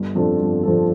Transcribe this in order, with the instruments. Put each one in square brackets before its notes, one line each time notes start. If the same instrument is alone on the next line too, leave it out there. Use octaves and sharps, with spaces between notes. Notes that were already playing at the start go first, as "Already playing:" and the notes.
Already playing: [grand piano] G1
F2 F3 D4 A4
G1
F2 F3 D4 A4